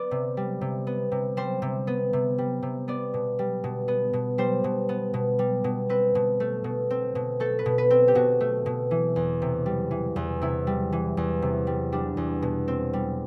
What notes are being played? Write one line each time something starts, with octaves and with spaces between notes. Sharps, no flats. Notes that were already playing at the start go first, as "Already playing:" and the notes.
Already playing: B3 D5
C3
G3
C3
B3
C3
G3 C5
C3
B3
C3
G3
C3
B3 D5
B2
G3
B2
B3
B2
G3 C5
B2
B3
B2
G3
B2
C4 B4
B2
A3
B2
C4
B2
A3 A4
B4
B2
B4
C4
G4
B2 F#4
A3
B2
E3
E2
C3
G3
E3
E2
C3 E4
G3
E3
E2
C3
G3
G3 D4
E2
B2
C4
G3